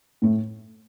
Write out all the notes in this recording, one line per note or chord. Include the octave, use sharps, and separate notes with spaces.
A2 A3